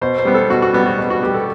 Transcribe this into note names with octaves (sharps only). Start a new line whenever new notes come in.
B2 C5
C5
G3 B3
A4
B2 F#4
F#4
G3 B3 F#4
F#4
B2
F#4
G3 B3 G4
A4